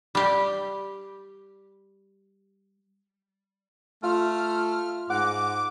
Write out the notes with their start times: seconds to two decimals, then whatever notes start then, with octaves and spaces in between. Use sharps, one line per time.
0.15 G3 G4
4.03 A3 F4 F6
5.10 G#2 F#5 D6